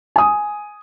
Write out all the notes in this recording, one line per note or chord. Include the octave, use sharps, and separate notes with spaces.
G#5 D#6